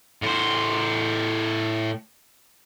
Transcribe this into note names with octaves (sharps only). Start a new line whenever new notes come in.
A2 C5